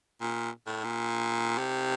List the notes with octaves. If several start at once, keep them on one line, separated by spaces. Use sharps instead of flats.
A#2
A2
A#2
C3